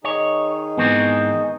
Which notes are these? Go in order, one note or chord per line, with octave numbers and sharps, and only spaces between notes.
D#3 D#4 G#4 C#5
G#2 E3 B3 C4 C#6 D#6